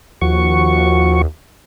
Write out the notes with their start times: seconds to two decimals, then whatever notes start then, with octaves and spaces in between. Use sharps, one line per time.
0.21 D#2 F3 F#4 C#6